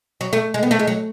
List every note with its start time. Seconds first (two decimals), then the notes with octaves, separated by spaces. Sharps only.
0.21 F#3
0.33 A3
0.54 G#3
0.63 B3
0.71 A3
0.79 G#3
0.87 F#3